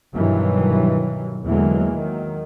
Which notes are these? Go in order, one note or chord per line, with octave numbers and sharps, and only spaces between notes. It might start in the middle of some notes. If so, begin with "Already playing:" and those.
G2 B2 D#3 E3 F#3
E2 D3 E3 F#3 G#3 A#3
D#3 F#3